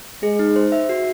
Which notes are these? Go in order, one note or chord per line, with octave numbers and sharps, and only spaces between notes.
G#3 G#4
D#4
C5
E5
F#4